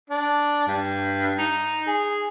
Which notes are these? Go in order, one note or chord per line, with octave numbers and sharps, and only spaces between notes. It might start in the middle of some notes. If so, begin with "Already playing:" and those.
D4
G2
D#4
G#4